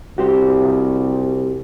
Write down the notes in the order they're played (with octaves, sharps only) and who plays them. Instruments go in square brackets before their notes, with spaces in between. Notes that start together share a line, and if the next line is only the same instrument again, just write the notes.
[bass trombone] C2 [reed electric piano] F#4 G4 C5